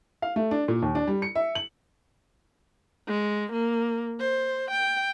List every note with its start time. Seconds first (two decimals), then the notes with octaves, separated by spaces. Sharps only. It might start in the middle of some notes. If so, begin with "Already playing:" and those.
0.22 F5
0.36 A3
0.51 D4
0.68 A#2
0.82 D#2
0.95 D4
1.07 G3
1.22 C#7
1.35 E5
1.55 F#7
3.07 G#3
3.52 A#3
4.20 C5
4.70 G5